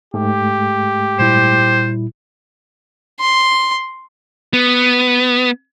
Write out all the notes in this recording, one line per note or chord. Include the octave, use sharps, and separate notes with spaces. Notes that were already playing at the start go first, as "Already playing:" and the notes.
G#2 G#3 A3 G4
A#2 G3 E4 C5
C6
B3